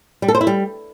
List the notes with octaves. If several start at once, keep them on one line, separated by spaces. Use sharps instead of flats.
G3
A4
C5
E4
G3